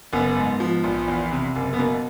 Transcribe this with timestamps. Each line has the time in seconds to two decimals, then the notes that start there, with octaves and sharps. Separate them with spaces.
0.13 F#1 B3
0.36 G#2
0.60 F3
0.84 A#1
1.08 E2
1.32 C3
1.56 F#1
1.73 B3
1.79 B2 A#3